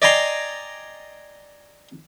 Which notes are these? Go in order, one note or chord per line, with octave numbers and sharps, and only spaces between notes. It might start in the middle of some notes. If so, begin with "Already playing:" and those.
D5 D#5 G5 G#5 A#5 C6